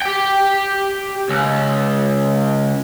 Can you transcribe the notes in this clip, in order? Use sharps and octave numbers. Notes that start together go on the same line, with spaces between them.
G4 G5
C#2